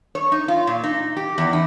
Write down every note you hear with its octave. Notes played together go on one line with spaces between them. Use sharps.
C#5
D#4
F4
A#2
D#4
G4
E2
D#4